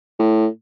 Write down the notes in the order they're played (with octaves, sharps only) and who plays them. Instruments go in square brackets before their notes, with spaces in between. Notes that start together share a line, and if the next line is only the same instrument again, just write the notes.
[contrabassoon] A2